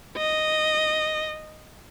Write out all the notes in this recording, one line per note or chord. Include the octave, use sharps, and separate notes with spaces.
D#5